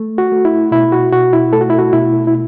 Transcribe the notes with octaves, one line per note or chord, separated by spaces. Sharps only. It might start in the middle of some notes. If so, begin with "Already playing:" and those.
Already playing: A3
F#4
A3
E4
B2 E4
F#4
B2 F#4
E4
A3 A4
F#4
E4
F#4
B2 E4
E4